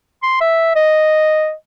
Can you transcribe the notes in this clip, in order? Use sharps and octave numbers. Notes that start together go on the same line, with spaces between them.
C6
E5
D#5